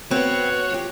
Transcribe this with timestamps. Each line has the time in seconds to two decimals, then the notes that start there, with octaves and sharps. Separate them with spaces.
0.11 B3 C4 F#4 C#5
0.71 F3 G4